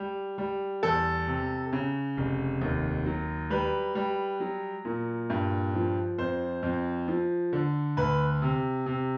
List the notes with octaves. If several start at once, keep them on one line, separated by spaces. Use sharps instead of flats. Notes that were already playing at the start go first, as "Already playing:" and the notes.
Already playing: G3
G3
E2 A4
C3
C#3
F1
D#2
F#3
G3 B4
G3
F#3
A#2
G2
F3
F2 C5
F2
F3
D3
D2 B4
C3
C3